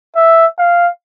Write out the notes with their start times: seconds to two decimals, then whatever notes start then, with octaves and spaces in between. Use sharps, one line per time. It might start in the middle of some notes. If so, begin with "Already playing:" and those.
0.16 E5
0.59 F5